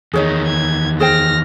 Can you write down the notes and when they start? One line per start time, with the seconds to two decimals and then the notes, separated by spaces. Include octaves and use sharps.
0.14 E2 D#3 G#4 C#5 D#5
0.47 G#6
1.00 G#4 C5 G5 F6 A#6